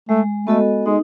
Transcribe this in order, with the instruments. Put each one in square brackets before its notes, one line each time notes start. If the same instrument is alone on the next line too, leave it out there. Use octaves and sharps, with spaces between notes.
[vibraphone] G#3 [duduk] A3
[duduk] A3 [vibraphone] B3 F#4 A4 D#5
[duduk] G#3 [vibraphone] D#4